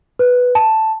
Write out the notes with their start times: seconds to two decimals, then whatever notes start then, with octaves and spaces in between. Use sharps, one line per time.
0.19 B4
0.55 A5